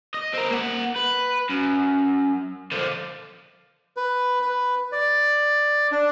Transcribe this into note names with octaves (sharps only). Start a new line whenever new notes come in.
D#5
C4 A#4
A#3 F#5
B4
F#2
D3 F3
B4
B4
D5
D4